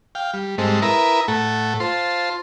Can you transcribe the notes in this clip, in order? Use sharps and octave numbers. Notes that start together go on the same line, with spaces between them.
F5 G5
G3
G#2 G3 G#3 C4 A4 D#5
E4 A#4 B4 E5 A#5 D#6
A2 A3 A4 F#5
F4 C5 A5 C6